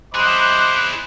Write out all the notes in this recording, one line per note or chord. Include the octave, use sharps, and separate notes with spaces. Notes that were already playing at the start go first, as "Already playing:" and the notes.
E4 G#4 C5 D#5 B5 D6 F#6